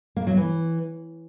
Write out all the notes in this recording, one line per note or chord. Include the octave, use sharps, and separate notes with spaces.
A#3
F#3
E3